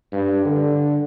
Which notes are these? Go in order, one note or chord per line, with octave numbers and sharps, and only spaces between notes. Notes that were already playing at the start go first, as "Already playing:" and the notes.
G2
D3